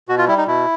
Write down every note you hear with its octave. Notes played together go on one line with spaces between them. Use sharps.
B2 F#4
F4
G3 E4
D#4
B2 E4